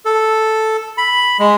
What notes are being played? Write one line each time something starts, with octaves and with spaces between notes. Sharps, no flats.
A4
B5
G#3